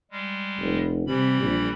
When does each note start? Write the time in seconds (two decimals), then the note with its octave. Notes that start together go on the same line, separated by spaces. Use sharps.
0.11 G3 G#3
0.58 F1
1.07 C3 E3 G3 B5
1.41 A#1